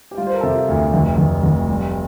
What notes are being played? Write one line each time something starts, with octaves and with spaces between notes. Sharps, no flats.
G4
G3 F4
C5
A#4
A4
C3 G4
F4
D2
F1
F1
F1
G3